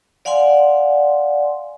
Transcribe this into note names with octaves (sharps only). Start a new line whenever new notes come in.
D5 F5 F#5 G#5 C6